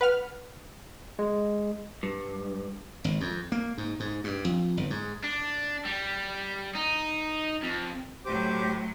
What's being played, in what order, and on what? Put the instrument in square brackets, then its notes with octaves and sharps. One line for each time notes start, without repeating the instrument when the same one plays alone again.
[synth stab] B4 F#5 F6
[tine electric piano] G#3
[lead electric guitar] G2
[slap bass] G#1
F2
A#3
G#2
G#2
G2
F2
G1
G#2
[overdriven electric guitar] D4
G3
D#4
F2
[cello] A2 F#3 [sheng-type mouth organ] G4 C5 D6